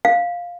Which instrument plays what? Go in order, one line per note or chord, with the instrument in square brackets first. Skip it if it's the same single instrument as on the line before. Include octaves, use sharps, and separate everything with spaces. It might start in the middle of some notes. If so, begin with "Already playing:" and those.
[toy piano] F5